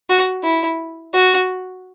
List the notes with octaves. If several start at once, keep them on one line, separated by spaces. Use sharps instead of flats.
F#4
E4
F#4